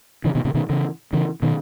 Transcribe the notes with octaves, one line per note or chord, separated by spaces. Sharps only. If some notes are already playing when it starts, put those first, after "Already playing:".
C#3 E3
B2 D#3
A#2 C#3
B2 D#3
C#3 E3
C#3 E3
B2 D#3